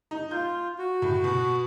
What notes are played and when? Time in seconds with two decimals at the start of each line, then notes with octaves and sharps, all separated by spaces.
0.11 D#4
0.31 F4 G6
0.79 F#4
1.02 A2
1.24 B2